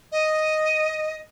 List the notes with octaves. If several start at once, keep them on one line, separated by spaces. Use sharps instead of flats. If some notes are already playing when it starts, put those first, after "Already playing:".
D#5